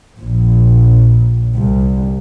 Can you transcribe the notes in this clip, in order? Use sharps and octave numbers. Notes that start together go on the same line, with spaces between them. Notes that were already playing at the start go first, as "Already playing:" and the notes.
A#1
C2